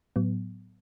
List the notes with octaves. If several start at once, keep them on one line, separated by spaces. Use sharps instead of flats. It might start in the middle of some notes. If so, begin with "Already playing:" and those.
A2 F#3 B3